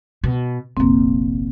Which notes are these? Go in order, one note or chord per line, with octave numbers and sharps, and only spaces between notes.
B2
F1 A#1 A#3 C4